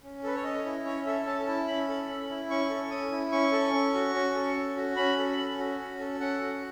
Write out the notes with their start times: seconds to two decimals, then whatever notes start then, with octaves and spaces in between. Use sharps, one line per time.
0.03 C#4
0.24 A4 B4
0.36 C#5
0.44 C#4 D#5
0.65 E4
0.85 C#4 C#5
1.06 A4 E5
1.26 C#4 A5
1.47 E4 A5
1.67 C#4 B5
1.89 A4
2.09 C#4
2.29 E4
2.50 C#4 C#6
2.70 A4
2.91 C#4 D#6
3.12 E4
3.32 C#4 C#6
3.52 A4
3.74 C#4
3.94 F#4
4.14 C#4
4.34 A4
4.56 C#4
4.77 F#4
4.96 C#4 B5
5.18 A4
5.37 C#4
5.59 F#4
5.79 C#4
5.99 A4
6.20 C#4 F#5
6.41 F#4